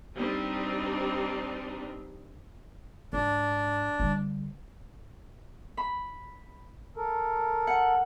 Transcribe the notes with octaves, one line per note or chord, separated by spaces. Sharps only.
G3 C4 D4 D#4 B4
G#2 D4
D3 G3
B5
A4 A#4
F#5